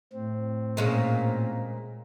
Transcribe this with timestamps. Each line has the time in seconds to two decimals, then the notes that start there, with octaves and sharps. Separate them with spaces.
0.13 A2 C4
0.77 A#2 G#3 C#4